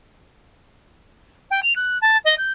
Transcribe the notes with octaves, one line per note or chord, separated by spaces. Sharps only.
G5
F7
F#6
A5
D#5
G6